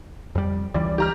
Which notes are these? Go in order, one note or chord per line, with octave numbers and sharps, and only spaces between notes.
F2 G3
C#2 E3 G3 D5
G4 A#5 F6